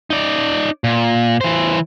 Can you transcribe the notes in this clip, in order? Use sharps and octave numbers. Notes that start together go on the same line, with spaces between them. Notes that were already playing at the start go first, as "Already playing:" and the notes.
D#4 D5
A#2
E3 C5